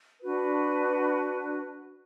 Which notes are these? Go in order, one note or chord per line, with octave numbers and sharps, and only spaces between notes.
D4 F#4 B4